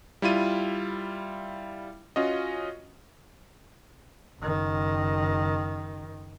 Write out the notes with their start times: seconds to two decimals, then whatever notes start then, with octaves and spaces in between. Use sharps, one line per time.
0.22 G3 E4 F4 D#7
2.16 C#4 F4 F#4 D#5
4.40 F#1 D#3